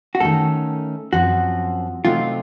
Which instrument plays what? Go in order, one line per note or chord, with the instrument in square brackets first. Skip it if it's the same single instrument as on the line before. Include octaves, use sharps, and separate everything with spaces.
[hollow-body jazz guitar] F#4
[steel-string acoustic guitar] D#3 A3 C#4 [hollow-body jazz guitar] A4
[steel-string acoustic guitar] F#2 F3 C4 [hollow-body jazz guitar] F#4
[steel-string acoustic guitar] C3 F#3 A3 C4 D#4 [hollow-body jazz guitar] F4